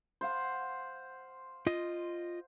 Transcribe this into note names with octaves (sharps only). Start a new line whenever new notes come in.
C5 F5 F#5
F4 D#5